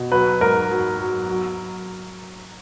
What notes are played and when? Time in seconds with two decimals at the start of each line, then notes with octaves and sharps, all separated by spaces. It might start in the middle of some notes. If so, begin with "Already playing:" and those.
Already playing: B2
0.11 F#3 B4
0.41 G#2 A#4
0.70 F#3
0.98 F#3
1.28 F#3